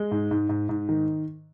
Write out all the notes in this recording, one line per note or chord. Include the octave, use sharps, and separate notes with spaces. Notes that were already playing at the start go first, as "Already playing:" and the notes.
Already playing: G#3
G#2
G#2
G#2
G#2
D#3